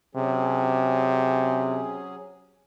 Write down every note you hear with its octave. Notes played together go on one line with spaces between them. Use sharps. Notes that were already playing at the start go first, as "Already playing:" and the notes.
C3 F#3 C#4 G#4